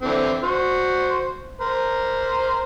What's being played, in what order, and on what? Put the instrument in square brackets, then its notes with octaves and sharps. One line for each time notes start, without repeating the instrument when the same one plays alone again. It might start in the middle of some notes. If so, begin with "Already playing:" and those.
[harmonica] D3 E3 C4
F#4 C5
A#4 C5